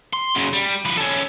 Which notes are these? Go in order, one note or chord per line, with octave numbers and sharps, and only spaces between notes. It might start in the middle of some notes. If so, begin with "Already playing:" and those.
C6
F#2 C#3
G3
F3 B4
C#4 A4